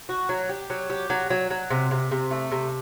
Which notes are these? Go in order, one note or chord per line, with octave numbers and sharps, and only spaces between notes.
F#4
F#3
G4
F#3
G4
F#3
F#3
F#3
C3
C3
C3
A3
C3